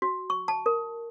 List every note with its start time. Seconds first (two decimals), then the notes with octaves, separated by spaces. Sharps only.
0.02 F#4
0.30 C#6
0.48 A5
0.66 A#4